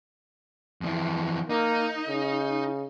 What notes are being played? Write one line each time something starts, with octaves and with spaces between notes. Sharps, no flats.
F2 E3
A#3 D#4
C#3